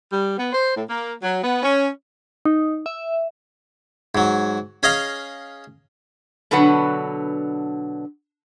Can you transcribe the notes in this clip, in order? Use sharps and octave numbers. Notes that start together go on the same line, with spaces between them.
G3
B3
C5
A2
A#3
F#3
B3
C#4
D#4
E5
G#2 F#3
C#4 G#4 D#5 F5 A#5
B2 D3 F#3 D4 B4 F#5